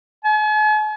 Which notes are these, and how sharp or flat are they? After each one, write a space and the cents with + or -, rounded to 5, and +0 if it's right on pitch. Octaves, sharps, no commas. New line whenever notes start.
G#5 +45